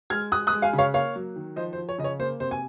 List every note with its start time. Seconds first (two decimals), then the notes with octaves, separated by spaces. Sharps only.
0.10 G#3 F6 G#6
0.32 G#3 D#6 F#6
0.47 D#6 F#6
0.52 G#3
0.62 F5 G#5
0.73 C#3
0.78 C#5 F5
0.94 A#3 C#5 F5
1.16 F#3
1.36 D#3
1.56 F3 C5 D#5
1.73 C5
1.78 F3
1.89 C#5
1.98 C#3 D#5
2.04 C#5
2.19 A#3 C5
2.40 C3 C5
2.51 G#5